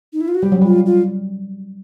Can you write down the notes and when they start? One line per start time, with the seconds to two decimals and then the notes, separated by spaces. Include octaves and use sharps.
0.13 D#4
0.21 E4
0.28 F4
0.35 F#4
0.42 G3 G4
0.52 F#3
0.61 G3 F4
0.86 F4